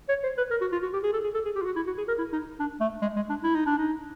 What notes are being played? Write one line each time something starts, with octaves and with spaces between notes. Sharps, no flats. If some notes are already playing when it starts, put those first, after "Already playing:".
C#5
C5
B4
A#4
F#4
F4
F#4
G4
G#4
A4
G#4
A4
G#4
G4
F4
F#4
E4
F#4
G#4
A#4
E4
D#4
D4
A3
G#3
G#3
D4
E4
D#4
D4
D#4